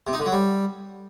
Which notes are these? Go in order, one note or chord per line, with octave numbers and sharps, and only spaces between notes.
C3
D#4
D3
F#3
G3